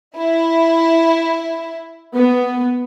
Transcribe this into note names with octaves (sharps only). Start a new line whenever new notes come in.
E4
B3